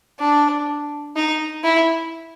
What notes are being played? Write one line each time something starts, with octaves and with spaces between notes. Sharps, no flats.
D4
D#4
E4